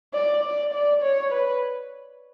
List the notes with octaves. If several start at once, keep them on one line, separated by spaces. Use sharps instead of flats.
D5
D5
D5
C#5
B4